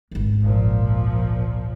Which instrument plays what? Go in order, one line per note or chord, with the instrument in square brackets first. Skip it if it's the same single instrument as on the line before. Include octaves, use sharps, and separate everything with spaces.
[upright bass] G#1 C#2
[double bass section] A#2 F3